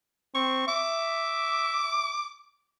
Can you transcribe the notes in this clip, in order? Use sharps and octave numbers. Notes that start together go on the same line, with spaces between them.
C4 C#6
E5 D6